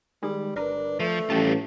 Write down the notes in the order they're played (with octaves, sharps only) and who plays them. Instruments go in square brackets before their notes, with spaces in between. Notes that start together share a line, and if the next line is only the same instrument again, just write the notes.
[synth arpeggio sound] D#3 G#3 [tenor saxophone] G3
[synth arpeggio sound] G1 A#4 B4 [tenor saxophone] D4
[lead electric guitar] F3 [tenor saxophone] A3
[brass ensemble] A1 [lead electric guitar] G3 F4 [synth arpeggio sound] G4 A5